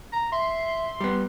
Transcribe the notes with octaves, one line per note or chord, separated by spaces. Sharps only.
A#5
E5 C6
G3 B3